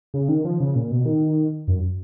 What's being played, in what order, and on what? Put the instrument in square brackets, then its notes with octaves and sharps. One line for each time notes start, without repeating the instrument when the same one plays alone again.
[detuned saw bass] C#3
D#3
F3
C#3
A#2
B2
D#3
F#2